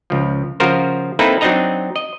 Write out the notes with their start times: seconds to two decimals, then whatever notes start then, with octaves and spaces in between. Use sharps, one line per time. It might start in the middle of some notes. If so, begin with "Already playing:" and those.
0.10 C#2 F3
0.60 C#3 F3 F4 F#4 A#4 C5
1.19 A#3 C4 D#4 E4 A4 B4
1.41 F#3 C4 D4 D#4 D#5 A#5
1.96 D#5